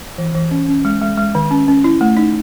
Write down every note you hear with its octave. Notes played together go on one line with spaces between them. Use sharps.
E3
E3
C#4
C#4
G#3
G#3
G#3
D#3
C#4
C#4
E4
A3
D#4